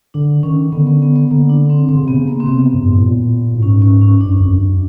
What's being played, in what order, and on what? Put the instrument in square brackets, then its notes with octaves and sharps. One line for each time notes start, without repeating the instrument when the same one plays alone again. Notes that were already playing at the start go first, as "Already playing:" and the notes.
[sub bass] D3 [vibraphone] D4
[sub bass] D#3 [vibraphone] C#4
[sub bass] D3 [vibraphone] B3
[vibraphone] B3
B3
B3
[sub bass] D3 [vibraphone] A#3
[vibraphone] D4
C4
[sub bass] D3 [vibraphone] C4
[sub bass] C#3
C3
[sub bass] C#3 [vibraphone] B3
[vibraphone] A#3
C4
[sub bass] C3 [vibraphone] B3
[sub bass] F#2
G2
G#2
A2
A#2
A2
[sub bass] G#2 [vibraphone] C#4
[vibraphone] C#4
C#4
[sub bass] G2 [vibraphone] D4
[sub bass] F#2
F2
F#2